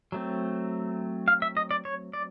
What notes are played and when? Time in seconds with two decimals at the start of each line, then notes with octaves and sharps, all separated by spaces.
0.12 F#3 A3 C4
1.28 F5
1.42 E5
1.57 D#5
1.71 D5
1.85 C#5
2.13 D5